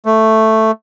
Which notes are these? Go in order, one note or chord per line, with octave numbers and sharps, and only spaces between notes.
A3